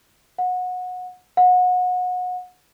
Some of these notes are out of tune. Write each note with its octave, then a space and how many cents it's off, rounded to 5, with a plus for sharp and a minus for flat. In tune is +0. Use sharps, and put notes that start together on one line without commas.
F#5 -25
F#5 -30